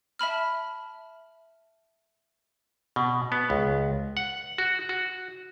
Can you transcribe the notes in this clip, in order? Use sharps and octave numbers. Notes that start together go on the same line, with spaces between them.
E5 A5 B5 F6
B2
B3
C#2
F#5
F#4
F#4